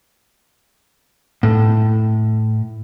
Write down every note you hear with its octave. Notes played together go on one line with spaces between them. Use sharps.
A2